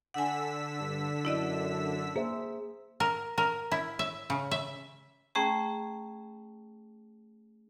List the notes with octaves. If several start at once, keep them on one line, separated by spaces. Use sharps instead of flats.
D3 F#5 G#5 E6 B6
G2
F#2 E4 D5 D#5
A#3 G#4 C5 E5
A#4
A#4
E4
E5
C#3
E5
A3 C#4 G#4 G5 A#5